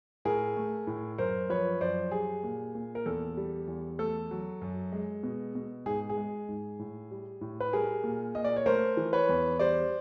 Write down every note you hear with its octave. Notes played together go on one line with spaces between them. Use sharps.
A2 G#4 A#4
A3
A2
F#2 A#4 C5
F3 B4 C#5
F#2 C5 D5
G3 G#4
A#2
A#2
A#4
E2 A4
G3
E2
A3 A4
F#3
F#2
G#3
B2
B2
G#2 G#4
G#4
G#3
G#2
A2
G3
A2
B4
G3 G#4 A#4
A#2
A#2 D#5
D5
C#5
A3 A#4 C5
E3
B4 C#5
E2
G3 C5 D5